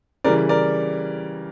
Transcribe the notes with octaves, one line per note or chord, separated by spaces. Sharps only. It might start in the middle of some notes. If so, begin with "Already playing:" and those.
C#3 E3 G3 A#4 D5
A#4 D5